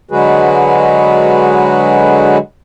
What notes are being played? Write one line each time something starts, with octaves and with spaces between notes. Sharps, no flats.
D3 F#3 G#3 F#4 G#4 B4